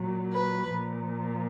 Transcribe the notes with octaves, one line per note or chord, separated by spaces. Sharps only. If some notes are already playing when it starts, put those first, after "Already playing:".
Already playing: A#2 F#3
B4
A#2 F3